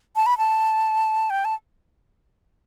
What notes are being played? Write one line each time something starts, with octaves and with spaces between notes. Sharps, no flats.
A5
B5
A5
G5
A5